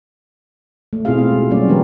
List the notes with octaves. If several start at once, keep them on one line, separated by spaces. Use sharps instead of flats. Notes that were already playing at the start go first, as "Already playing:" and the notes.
A3
B2 C4 E4 F4 G#4 F5
F4
G#3
F#3 G3 A#3 C#4 D5
E3 A3 D4 G4 A#4 B4